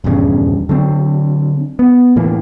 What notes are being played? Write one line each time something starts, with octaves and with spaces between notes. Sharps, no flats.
D#1 E2 G2 C#3
D3 F#3 C4
B3
A2 E3 A#3